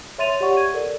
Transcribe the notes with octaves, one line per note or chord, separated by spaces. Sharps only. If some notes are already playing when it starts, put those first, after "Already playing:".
C#5 E5 C6 A6 D#7 F7
G4 C#5 D5 F#5 C#6
G#6 D#7
A4 A#4 D5